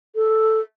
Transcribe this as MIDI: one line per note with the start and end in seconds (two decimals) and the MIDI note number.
0.16 0.60 69